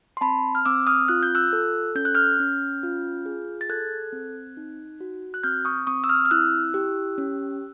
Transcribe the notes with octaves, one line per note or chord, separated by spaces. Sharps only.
C6
C4 A5 B5
F6
C4 D6 E6
D#6 F6
F4 F#6
G6
E6 F#6
A4
C#4 G6
F#6
F6 G6
C#4
F4
G#4
A6
A4 F#6 G#6
C4
D#4
F#4
F#6
C4 F6 G6
C#6 D#6
C4 C#6 D#6
E6
D#6 F6
F6
E4 E6 F#6
G4
C#4